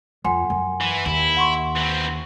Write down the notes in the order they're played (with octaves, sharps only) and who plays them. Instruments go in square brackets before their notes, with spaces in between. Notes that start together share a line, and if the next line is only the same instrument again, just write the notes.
[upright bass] F2 [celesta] F#5 G#5 C6
[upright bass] F#2
[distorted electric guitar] E3
[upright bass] D#2 [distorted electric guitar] E4
[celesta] F#5 C6 C#6
[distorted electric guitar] E3 C4